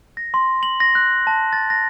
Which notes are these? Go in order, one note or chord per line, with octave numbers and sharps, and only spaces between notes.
A#6
C6
F#7
A#6
F#6
A5
A6
A#6